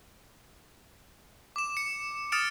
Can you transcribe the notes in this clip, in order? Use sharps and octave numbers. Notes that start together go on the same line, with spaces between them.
D6 E7
C#7
D#6 F6 A6 C#7 D7 E7